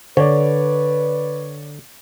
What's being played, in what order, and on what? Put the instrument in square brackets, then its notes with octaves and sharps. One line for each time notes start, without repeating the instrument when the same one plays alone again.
[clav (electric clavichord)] D3 [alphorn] B4 [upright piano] C#5 D5